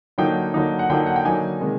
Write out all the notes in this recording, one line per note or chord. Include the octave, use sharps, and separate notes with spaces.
D3 F#3 A#3 D#4 G5
D3 F#3 A#3 D#4
F#5
D3 F#3 A#3 D#4 G5
F#5
G5
D3 F#3 A#3 D#4 G#5
C3 D#3 G#3